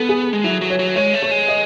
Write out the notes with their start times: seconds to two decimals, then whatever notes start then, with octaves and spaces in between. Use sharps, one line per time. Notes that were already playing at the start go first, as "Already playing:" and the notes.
Already playing: B3 A4
0.09 G#4
0.33 G#3
0.44 F#3 E4
0.61 F#3
0.70 C#5
0.79 F#3
0.96 G#3 C#5
1.14 A3
1.23 C#5
1.31 G#3
1.48 D#5